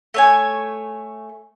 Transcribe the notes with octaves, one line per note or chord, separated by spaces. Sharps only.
A3 C#5 G#5